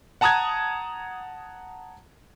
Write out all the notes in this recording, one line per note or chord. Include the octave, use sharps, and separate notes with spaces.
F#5 A5 A#5 D#6 F#6 G#6